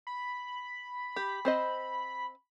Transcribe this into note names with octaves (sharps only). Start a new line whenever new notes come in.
B5
G4
C4 C5 D#5